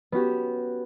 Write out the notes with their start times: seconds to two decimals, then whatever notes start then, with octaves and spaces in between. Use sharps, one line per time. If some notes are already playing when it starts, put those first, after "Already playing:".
0.12 B3 C#4 F#4 G4